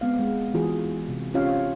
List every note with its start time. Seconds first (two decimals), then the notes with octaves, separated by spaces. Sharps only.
0.01 G#3 B3 C4 F5
0.19 G#3
0.54 E3 G#3 F4 F#4 G#4
1.09 C3
1.34 C4 C#4 F4 G4 C#5 F5